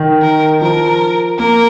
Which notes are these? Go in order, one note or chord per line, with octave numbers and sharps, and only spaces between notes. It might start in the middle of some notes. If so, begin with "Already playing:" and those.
Already playing: D#3
A#4
F3 A#4
A#3 A#4